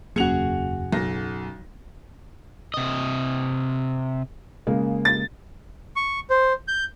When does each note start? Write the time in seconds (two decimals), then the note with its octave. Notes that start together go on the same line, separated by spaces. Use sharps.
0.16 E1 F#2 C#3 A#3 F#4 G#4 C#7 F7
0.92 B1 F#3 A#6
2.74 C3 D#5
4.67 C#3 G#3 A#3
5.05 A6
5.96 C#6
6.30 C5
6.68 G6